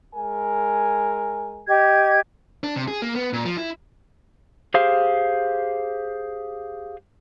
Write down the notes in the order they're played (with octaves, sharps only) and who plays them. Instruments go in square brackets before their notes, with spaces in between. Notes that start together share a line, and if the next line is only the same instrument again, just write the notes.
[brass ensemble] G#3 A#4 G#5
[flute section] G4 D#5 G#6
[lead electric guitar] D4
C3
G#4
A#3
B3
A#2
F3
E4
[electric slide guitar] G4 G#4 C5 F5